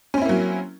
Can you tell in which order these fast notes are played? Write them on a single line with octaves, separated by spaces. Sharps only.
C#4 C4 E4 A#3 F#3